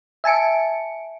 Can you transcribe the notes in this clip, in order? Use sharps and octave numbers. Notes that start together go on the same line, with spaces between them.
E5 G#5 A5 C#7 D7